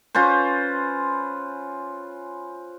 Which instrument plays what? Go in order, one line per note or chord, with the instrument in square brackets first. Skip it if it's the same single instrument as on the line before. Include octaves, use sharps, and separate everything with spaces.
[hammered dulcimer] C#4 F4 B4 C5